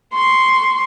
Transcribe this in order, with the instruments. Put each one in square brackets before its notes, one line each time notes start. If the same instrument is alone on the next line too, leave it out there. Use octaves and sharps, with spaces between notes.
[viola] C6 C#6